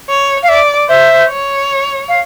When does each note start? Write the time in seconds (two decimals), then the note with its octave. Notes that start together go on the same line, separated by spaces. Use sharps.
0.09 C#5
0.43 F5
0.49 D5 E5
0.89 C5 E5
1.29 C#5
2.09 F5